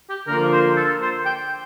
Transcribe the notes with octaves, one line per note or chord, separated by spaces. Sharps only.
G4
D3 F3 A#3 F4 A#4
C5
A4
C5
G5